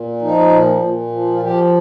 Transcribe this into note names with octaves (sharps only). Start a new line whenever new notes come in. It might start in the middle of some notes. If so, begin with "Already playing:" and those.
Already playing: A#2
F3 D#4
A#2
A#2
F3
F4
F3 G4